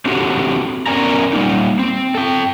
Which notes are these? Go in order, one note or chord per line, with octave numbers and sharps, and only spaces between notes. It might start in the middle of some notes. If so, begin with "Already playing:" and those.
C4 D4 F#4 G4 A4
B3 C#4 A#4 D5 G#5 A#5
G3 A#3 D#4
C4
A4 G5